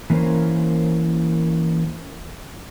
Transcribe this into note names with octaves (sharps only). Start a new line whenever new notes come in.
E3 A#3 C#4 A#4 C5